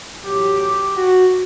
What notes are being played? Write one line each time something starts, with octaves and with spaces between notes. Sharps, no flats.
A1 A2 F#3 G4
G4
F#4